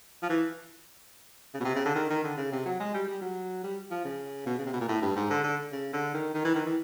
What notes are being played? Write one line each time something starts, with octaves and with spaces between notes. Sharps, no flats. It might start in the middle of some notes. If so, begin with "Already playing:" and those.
F3
E3
C#3
B2
C3
C#3
D3
D#3
D#3
D3
C#3
C3
F#3
G#3
G3
G3
F#3
G3
F3
C#3
B2
C#3
C3
B2
A#2
A2
G2
G#2
D3
D3
C#3
D3
D#3
D#3
E3
D#3
E3